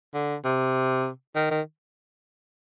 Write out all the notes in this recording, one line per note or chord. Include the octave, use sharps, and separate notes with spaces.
D3
C3
D#3
D#3